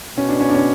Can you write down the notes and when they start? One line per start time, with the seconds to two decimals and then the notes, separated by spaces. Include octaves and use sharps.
0.17 B2 C#4
0.29 D4
0.41 C#4
0.49 D4
0.55 C#4